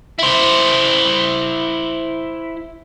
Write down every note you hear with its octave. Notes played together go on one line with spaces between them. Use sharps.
E4 C5